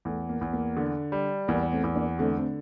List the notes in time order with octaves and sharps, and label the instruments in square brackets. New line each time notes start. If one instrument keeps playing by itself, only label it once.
[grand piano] E2 [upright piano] A3
[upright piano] A#3
[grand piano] E2
[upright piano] A#3
[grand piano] D3
G3
[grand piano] E2 [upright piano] A#3
[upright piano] A3 C4
[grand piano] E2
[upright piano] A#3 D4
[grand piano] D3 [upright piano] A3 C4
[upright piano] A3 C4